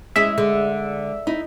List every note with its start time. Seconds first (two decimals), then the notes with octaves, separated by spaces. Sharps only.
0.16 G#3 C#4 E4 E5
0.38 D3 G#3
1.27 D#4 E4